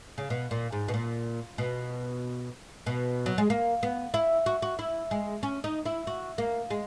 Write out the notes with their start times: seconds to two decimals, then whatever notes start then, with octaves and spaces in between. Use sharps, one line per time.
0.18 C#3
0.30 B2
0.51 A#2
0.72 G#2
0.88 B2
0.94 A#2
1.58 B2
2.86 B2
3.26 F#3
3.38 G#3
3.50 A#3
3.83 B3
4.14 E4
4.46 F#4
4.62 F#4
4.79 E4
5.11 G#3
5.43 C#4
5.64 D#4
5.86 E4
6.07 F#4
6.38 A#3
6.70 G#3